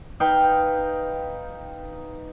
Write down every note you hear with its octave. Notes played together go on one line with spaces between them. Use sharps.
D#4 B4 F5 G5